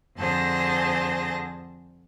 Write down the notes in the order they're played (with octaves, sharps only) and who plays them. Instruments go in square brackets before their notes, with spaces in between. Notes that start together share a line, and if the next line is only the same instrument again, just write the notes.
[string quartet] F2 D3 G#4 C5 A5 A#6